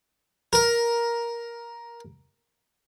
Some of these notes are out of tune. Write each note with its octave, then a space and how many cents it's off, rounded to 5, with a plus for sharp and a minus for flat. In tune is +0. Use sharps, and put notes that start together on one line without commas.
A#4 +10